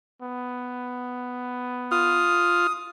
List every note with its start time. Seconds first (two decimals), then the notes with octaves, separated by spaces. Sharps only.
0.22 B3
1.92 F4 D#6